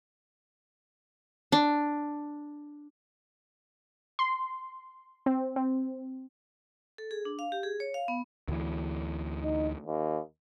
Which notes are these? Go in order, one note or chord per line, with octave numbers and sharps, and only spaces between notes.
D4
C6
C4
C4
A4
G#4
D4
F5
G4
G#4
C#5
F5
B3
D2 E3
D#4
D#2